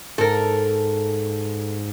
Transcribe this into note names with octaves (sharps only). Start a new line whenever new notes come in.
G#2 A4 A#4